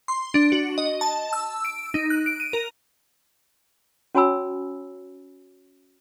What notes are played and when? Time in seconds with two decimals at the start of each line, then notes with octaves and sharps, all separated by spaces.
0.08 C6
0.34 D4
0.52 F#4
0.78 D#5
1.01 A5
1.33 E6
1.65 D7
1.94 D#4
2.10 F#6
2.26 D7
2.40 D#7
2.53 A#4
4.15 C#4 F#4 C#5 G#5 B5 E6